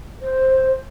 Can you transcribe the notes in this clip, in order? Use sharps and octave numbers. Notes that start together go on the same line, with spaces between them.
C5